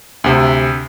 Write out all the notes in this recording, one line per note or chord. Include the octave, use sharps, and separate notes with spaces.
D2 C3